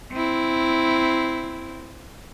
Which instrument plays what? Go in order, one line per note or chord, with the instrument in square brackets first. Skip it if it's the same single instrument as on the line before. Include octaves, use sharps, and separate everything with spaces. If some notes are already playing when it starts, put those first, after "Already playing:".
[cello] C4 E4